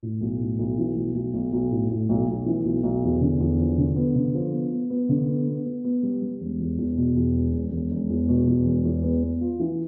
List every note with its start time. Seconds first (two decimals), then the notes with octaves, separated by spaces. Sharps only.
0.03 A2
0.21 B1
0.40 A2
0.59 B1
0.77 E3
0.96 B1
1.15 B1
1.34 B1
1.52 B1
1.71 A2
1.90 A2
2.09 B1
2.28 B1
2.46 E3
2.65 B1
2.83 B1
3.03 E2
3.21 D3
3.40 E2
3.59 F3
3.78 D3
3.96 B3
4.16 D3
4.35 F3
4.53 B3
4.72 B3
4.90 B3
5.09 D3
5.29 B3
5.47 B3
5.66 B3
5.84 B3
6.03 G3
6.22 G3
6.40 E1
6.60 E2
6.78 E2
6.97 B2
7.16 E2
7.35 E1
7.54 E1
7.72 E1
7.91 E1
8.10 E2
8.29 B2
8.47 E2
8.66 E1
8.85 E2
9.03 B3
9.22 B3
9.41 F4
9.59 E3